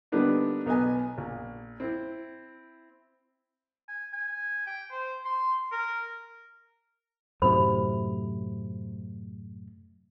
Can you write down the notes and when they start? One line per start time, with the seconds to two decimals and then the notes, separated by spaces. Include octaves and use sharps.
0.12 D3 G3 A#3 B3 D4 D#4
0.66 B1 B3 D#5 G#5
1.18 A#1
1.80 C4 E4
3.88 G#5
4.13 G#5
4.67 G5
4.91 C5
5.25 C6
5.72 A#4
7.42 F#2 A2 C3 C5 B5